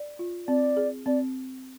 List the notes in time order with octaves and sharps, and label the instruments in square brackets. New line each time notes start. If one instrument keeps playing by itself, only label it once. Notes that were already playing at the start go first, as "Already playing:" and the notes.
Already playing: [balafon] D5
F4
[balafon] C4 [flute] D5
[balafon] G#4
[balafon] C4 [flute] D5